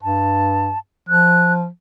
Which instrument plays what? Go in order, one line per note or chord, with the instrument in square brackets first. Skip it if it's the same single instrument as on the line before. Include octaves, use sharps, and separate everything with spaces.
[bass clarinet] G2 [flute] A5
[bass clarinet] F3 [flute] F#6